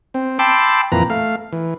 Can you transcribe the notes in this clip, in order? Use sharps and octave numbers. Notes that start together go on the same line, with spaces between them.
C4
G5 A5 B5 C6 D6 E6
F2 A#2 E3 B4 A#5
A3 F5
E3